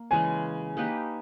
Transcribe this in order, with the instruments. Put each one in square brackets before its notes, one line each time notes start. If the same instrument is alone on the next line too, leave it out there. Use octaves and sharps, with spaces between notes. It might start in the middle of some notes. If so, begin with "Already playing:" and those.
Already playing: [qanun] A#3
[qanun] C#3 E3 G#3 [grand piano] G#5
[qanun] A#3 D#4 G4 B4